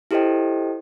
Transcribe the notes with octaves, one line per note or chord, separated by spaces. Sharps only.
E4 G4 A4 C5 D#5 G5